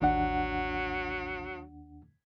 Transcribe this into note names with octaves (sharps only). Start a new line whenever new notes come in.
A1 D#2 F#3 D4 F#5